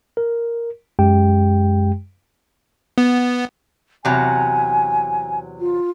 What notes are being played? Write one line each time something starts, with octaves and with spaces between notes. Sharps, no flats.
A#4
F#2 G#3 G4 G5
B3
E2 C3 F#3 G#5
F4